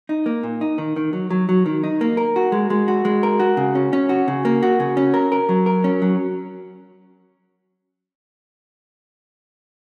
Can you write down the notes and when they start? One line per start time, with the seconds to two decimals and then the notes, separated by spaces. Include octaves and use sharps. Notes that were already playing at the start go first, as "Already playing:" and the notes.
0.09 D#4
0.26 A#3
0.43 A#2
0.61 D#4
0.78 D#3
0.96 D#3
1.13 F#3
1.30 F#3
1.49 F#3
1.66 D#3
1.84 D#4
2.01 A#3
2.17 A#4
2.36 F#4
2.52 G#3
2.70 G#3
2.88 F#4
3.05 G#3
3.23 A#4
3.40 F#4
3.57 C#3
3.75 C#4
3.93 C#4
4.09 F#4
4.28 C#3
4.45 A#3
4.63 F#4
4.80 C#3
4.97 C#4
5.14 A#4
5.32 A#4
5.49 F#3
5.66 A#4
5.84 C#4
6.02 F#3